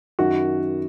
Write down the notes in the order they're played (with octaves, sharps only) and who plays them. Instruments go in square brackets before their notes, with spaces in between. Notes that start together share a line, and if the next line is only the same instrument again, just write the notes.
[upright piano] F#2 D#3 F#4